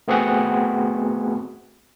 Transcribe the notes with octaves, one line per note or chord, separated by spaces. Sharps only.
A3 B3 C4 F#4 G#4 F#5